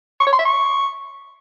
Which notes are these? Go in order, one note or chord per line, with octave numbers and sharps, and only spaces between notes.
C#6
C#5
C6
E5
C#6